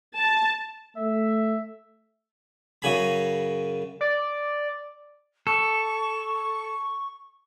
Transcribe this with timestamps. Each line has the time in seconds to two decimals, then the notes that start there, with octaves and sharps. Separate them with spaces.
0.17 A5
0.97 A3 E5
2.82 F#2 C#3 G#5 B5
4.01 D5
5.47 A4 C#6